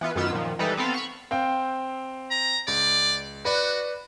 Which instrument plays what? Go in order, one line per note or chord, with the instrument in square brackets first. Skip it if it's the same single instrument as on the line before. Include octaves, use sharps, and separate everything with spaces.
[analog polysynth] E3 B3 F4 B4
F#2 D#3 B3 F4 E6
A#2 D#3 F3
E3 G3 G#3 D#4 A4 B4
B3 C4 A4 F5
B5 C#6
[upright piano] C4 F5 G5
[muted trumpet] A#5
[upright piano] C#2 [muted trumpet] D5
[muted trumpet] F#4 [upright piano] B4 D5